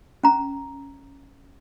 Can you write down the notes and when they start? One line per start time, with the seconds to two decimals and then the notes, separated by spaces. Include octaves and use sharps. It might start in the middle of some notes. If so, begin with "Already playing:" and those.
0.23 C#4 A#5